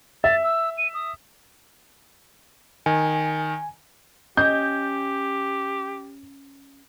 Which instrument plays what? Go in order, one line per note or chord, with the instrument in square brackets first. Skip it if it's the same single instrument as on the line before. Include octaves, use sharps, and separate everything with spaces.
[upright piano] E5 [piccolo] A6
[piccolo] E6
D#7
D#6
[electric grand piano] D#3 [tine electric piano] G#5
[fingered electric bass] C#4 [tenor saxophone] G4 [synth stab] D#5 [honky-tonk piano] G6